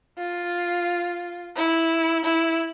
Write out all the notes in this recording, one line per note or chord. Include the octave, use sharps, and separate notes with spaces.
F4
E4
E4